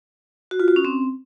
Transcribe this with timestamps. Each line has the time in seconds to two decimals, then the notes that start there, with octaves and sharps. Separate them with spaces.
0.51 F#4
0.60 F4
0.68 F#4
0.76 C#4
0.85 C4